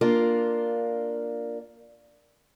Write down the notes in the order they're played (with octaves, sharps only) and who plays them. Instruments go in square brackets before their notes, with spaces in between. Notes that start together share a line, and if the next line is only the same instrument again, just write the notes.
[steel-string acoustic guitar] A#3 D4 F4